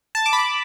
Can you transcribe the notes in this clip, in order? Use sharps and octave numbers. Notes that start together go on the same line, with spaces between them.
A5
D6
B5
D6